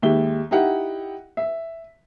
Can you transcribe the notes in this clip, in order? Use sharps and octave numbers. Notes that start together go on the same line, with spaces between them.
D#2 G#3 G4 E5 G7
D#4 E4 G4 F#5
E5